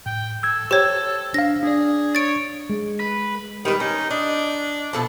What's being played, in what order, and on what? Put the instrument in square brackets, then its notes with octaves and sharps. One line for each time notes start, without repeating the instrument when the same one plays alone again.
[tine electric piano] A2 [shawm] G5
[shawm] A4 [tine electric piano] E6 G#6
[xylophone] G4 C#5 [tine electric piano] C5 G5 G#6
[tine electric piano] D4 F5 [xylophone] A#6
[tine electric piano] D4 D5 [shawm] G#4
[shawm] C#5 [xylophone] A6 D7
[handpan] G#3
[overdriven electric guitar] B4
[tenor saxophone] D#3 [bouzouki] G3 B4
[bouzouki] C#4 [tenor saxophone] D#4
[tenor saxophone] D4 [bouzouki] D#5
[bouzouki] B2 A4 A5 [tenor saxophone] F3